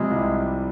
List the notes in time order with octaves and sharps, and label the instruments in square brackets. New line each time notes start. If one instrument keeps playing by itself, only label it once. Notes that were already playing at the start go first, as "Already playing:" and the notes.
Already playing: [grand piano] C3 F3 G3 [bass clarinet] G#3
[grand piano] C2